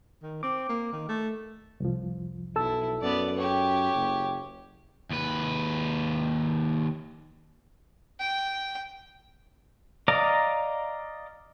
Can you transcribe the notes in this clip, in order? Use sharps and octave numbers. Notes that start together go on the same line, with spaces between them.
D#3
C4 D6
A#3
D#3
A3
C2 F2 F3
B1 E4 A4 A5 E6
F#2 B3 D5
G4 C#5
F#1
D#2 B4
G5
D5 D#5 F5 A#5 D6